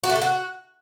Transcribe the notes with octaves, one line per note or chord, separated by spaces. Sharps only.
F#4
A3
A4
F#4